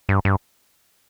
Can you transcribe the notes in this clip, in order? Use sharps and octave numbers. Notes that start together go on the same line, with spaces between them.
G2
G2